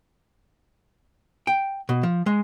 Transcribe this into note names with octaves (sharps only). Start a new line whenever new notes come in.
G5
B2
F3
G#3